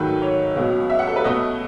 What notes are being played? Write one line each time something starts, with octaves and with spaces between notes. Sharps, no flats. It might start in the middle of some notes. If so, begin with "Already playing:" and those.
Already playing: G#2 D#3 F#3 A3 B4
C#5
C#2 B2 F#3
E5
F#5
A4
B4
B2 A3 D#5